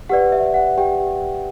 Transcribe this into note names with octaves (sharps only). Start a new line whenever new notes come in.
G4 B4 D5 F#5
E5
F#5
G4 G5